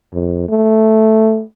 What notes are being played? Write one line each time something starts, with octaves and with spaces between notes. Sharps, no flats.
F2
A3